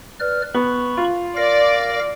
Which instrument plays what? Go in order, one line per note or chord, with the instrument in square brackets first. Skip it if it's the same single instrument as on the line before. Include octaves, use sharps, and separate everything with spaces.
[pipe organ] B4 D5 F6
[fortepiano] B3 [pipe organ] B5 C#6
[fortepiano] F4
[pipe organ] A#4 F5 A#6 [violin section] D5